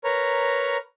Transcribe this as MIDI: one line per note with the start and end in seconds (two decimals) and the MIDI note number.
0.04 0.77 70
0.04 0.77 71
0.04 0.77 73
0.04 0.77 82